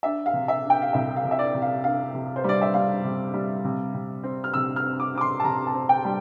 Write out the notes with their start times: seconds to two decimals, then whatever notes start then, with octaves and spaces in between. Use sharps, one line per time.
0.03 D4 E5
0.26 F5
0.33 C3
0.48 E5
0.64 D4
0.70 G5
0.82 F5
0.93 C2 E5
1.16 F5
1.24 C3
1.31 E5
1.39 D5
1.54 C3
1.62 F5
1.83 D4 F5
2.14 C3
2.36 C5
2.44 G3 D5
2.61 E5
2.74 G3 F5
3.04 C3
3.34 G3
3.64 C3
3.94 C3
4.23 C4
4.44 F6
4.54 C3 E6
4.76 F6
4.84 C4
5.00 D6
5.15 C4 D6
5.21 C6
5.40 A5
5.44 C3 A#5
5.67 A5
5.74 C4
5.89 G5
6.05 G3